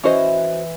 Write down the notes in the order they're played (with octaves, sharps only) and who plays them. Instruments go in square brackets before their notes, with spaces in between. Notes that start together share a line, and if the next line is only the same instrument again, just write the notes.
[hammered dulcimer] E3 [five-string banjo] C#4 F#4 C5 D#5